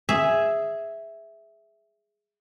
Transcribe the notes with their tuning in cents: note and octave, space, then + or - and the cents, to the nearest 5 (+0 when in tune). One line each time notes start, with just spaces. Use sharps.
G#4 +0 E5 +0